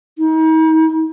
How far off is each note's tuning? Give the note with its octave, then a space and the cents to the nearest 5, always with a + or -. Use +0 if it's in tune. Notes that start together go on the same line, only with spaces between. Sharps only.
D#4 +40